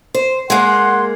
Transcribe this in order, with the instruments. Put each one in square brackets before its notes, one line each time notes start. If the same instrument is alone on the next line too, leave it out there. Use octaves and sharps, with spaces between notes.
[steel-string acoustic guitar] C5
[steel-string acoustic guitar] G#3 A#3 [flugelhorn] F#5 [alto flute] C6